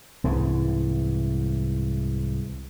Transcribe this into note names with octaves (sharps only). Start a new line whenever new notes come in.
C2 G#2 E3